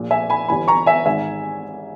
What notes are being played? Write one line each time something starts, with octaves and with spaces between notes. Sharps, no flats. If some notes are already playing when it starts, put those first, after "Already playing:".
Already playing: A#1 A#2
E5 G#5
G#5 B5
G1 G2 E3 G#5 B5
A#5 C#6
E5 G#5
G#1 G#2 D#3 E5 G#5